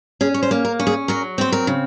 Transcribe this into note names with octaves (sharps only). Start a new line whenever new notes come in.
C#4 G#4
C#5
C5
A#3
A#4
C#4
G#4
F#3 A#4
C4 C5
A#4
C#3